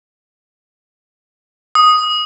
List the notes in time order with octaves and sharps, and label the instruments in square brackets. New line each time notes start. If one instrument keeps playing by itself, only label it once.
[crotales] D#6